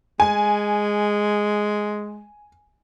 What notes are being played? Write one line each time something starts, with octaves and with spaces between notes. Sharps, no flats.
G#3 G#5